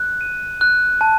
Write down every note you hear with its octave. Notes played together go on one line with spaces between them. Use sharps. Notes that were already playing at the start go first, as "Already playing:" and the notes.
Already playing: F#6
D#7
F#6
A5